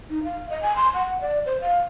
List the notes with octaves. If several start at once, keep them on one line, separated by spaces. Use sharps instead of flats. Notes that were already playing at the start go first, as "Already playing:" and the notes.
D#4
F5
D#5
G#5
C6
F#5
D5
C5
F5